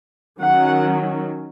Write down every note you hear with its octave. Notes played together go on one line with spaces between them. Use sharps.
D#3 F#3 C#4 F#5